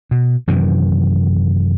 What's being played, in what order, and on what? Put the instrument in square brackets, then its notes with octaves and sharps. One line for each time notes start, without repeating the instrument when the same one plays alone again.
[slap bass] B2
F#2 C3 D#3 E3